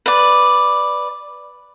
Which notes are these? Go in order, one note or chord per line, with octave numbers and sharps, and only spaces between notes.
B4 D5